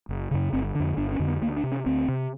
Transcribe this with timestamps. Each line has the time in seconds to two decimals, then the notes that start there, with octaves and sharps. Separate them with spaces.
0.09 F#1
0.31 F#2 C#3
0.53 G1 C4
0.75 D3 D4
0.80 F2
0.97 G1 D4
1.12 C#4
1.19 F2 D3
1.27 B3
1.42 D2 A#3
1.57 D4
1.63 C3
1.72 C#4
1.86 D2 C4
2.08 C3